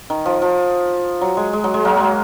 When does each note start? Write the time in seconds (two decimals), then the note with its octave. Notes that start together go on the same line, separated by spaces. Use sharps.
0.10 D#3
0.26 F3
0.42 F3
1.21 F#3
1.37 G#3
1.53 G#3
1.64 F#3
1.74 G#3
1.85 F#3 A#3
2.00 G#3